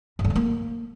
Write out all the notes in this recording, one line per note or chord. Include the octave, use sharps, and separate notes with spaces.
G2
D3
F#3
A#3